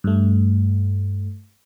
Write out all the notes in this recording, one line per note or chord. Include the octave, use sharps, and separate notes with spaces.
G2 A3